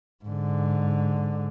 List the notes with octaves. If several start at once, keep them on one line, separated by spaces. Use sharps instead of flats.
G#2 D3